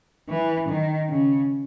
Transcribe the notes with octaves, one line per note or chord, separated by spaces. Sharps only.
E3
D#3
C#3